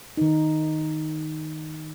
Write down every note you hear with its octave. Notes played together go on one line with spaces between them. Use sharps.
D#3 D#4